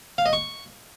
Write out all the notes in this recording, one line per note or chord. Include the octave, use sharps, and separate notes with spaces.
F5
D#5
C#6